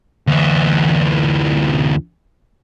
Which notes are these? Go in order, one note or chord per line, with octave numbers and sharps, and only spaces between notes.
D2 E3